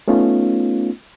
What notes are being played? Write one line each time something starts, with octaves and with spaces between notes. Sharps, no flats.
A3 B3 C#4 D#4 F4